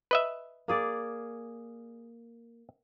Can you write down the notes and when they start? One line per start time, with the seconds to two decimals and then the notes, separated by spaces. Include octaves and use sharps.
0.11 B4 D#5 E5
0.68 A#3 G#4 D5